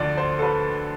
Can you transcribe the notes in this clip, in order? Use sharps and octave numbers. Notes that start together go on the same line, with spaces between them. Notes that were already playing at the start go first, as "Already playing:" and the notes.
Already playing: D2 D3 F3 D5
C5
A4
B4